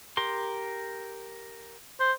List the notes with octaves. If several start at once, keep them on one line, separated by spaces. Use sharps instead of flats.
G4 A#4 C6
C5